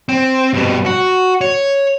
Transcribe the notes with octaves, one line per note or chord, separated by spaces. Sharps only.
C4
G2 B2
F#4
C#5